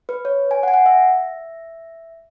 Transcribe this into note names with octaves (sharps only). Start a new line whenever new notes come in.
B4
C#5
G#5
F#5
G#5
F#5
E5